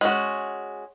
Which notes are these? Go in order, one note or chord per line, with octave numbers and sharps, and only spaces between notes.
G#3 C#4 F#4